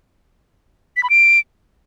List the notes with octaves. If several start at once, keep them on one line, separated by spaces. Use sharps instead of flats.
B6
B5
D7